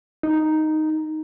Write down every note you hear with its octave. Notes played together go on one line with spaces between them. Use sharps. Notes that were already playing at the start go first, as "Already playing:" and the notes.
D#4